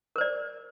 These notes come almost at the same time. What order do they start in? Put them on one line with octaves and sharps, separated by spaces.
A#4 C5 D5